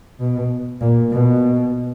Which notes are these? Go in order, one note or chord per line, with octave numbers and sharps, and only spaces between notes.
B2
A#2
B2